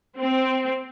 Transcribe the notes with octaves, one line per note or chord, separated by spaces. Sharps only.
C4